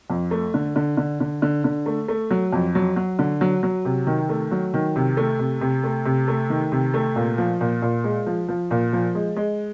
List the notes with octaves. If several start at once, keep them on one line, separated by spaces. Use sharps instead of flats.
F2
A3
D3
D3
D3
D3
D3
D3
A3
A3
F#3
F2
F#3
F#3
D3
F#3
F#3
C3
D#3
A3
F#3
D#3
C3
A3
C3
C3
A3
C3
A3
D#3
C3
A3
A#2
F3
A#2
A#2
G#3
F3
F3
A#2
F3
G#3
G#3